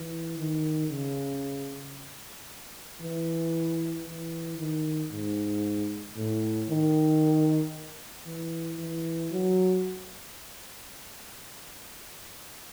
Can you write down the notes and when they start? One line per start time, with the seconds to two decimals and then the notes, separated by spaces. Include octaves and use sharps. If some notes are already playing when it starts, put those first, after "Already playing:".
Already playing: E3
0.38 D#3
0.91 C#3
3.01 E3
4.06 E3
4.58 D#3
5.11 G#2
6.16 A2
6.69 D#3
8.26 E3
8.79 E3
9.32 F#3